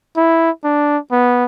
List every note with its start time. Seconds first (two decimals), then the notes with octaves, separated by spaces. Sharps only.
0.17 E4
0.64 D4
1.12 B3